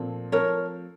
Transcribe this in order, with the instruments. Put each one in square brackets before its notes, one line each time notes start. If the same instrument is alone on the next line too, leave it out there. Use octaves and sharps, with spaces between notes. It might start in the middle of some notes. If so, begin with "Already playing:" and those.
Already playing: [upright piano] A#2 F3 A3 C4
[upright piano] F3 A3 C4 [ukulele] A#4 C#5